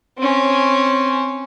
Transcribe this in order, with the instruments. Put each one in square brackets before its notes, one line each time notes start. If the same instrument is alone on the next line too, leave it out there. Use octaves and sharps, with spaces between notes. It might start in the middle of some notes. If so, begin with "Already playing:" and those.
[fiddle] C4 C#4